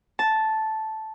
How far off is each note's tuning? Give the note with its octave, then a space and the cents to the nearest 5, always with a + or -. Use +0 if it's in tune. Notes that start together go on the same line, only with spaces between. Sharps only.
A5 -5